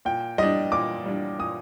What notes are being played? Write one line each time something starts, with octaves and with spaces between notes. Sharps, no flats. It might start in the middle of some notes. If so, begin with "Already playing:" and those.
A#2 G5
G3 D4 D#5
A#2 D6
G3 D4
A#2 D#6